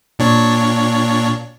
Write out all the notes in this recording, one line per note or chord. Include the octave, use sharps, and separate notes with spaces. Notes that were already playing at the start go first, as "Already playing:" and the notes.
A#2 D4 C#5